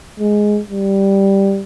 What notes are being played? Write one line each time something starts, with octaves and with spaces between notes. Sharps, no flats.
G#3
G3